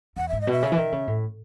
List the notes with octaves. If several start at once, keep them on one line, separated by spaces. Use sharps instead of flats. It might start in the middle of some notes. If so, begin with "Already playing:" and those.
E2 F#5
G#2 E5
D#5
B2
E5
C#3
E3
D#3
C#3
A2